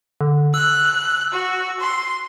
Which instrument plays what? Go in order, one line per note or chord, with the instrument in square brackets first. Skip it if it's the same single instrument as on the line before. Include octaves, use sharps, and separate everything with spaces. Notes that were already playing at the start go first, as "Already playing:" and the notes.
[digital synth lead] D3
[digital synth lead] E6 [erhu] F#6
[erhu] F#4
C6